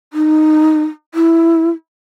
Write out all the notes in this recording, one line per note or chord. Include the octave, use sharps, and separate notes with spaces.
D#4
E4